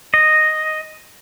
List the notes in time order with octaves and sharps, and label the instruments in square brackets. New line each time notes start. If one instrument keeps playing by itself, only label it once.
[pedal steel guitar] D#5